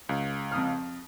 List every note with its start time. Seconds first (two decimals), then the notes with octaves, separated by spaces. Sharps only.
0.09 C#2
0.52 F2 D#6 F6